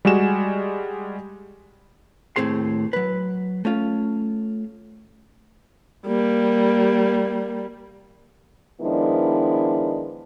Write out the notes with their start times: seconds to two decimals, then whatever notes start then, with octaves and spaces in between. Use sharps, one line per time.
0.05 G3 G#3 F#4 G#5 E7
2.36 D#2 A2 C4 G#4 C6
2.93 F#3 B4
3.65 A3 C#4 F4
6.07 G3 A#3
8.81 D#3 F3 G#3 B3 D4 E4